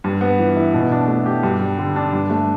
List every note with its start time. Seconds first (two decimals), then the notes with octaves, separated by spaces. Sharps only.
0.04 G2
0.21 B3
0.39 E3
0.57 E4
0.74 B2
0.92 D4
1.08 A3
1.26 G4
1.43 G2
1.61 G3
1.78 D3
1.96 D4
2.13 G2
2.30 A3